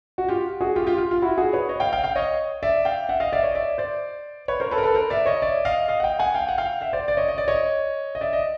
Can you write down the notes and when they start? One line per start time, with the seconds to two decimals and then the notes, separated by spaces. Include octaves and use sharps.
0.18 F#4
0.29 F4 G4
0.61 F#4 G#4
0.76 F4 G4
0.87 F4 G4
0.98 F4
1.11 F4
1.22 E4 F#4
1.37 F#4 G#4
1.53 B4 C#5
1.69 C#5 D#5
1.80 F5 G5
1.93 F5 G5
2.04 F5 G5
2.16 C#5 D#5
2.63 D5 E5
2.85 F5 G5
3.09 E5 F#5
3.20 D#5 F5
3.33 D5 E5
3.43 C#5 D#5
3.55 D5 E5
3.78 C5 D5
4.48 B4 C#5
4.60 A#4 C5
4.71 A4 B4
4.78 A#4
4.83 A4 B4
4.95 A#4 C5
5.10 D5 E5
5.26 C#5 D#5
5.42 D5 E5
5.65 D#5 F5
5.88 D#5 F5
6.00 F#5
6.03 F5 G5
6.19 F#5 G#5
6.34 F5 G5
6.49 F#5
6.58 F5 G5
6.81 E5 F#5
6.93 C5 D5
7.08 D5
7.17 C#5 D#5
7.28 D#5
7.38 D5
7.48 C#5 D#5
8.15 D#5
8.21 D5 E5
8.33 D#5